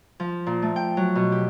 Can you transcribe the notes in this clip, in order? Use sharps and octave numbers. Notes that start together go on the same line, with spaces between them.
F3
A#2
A3
G5
F#3
B2
G4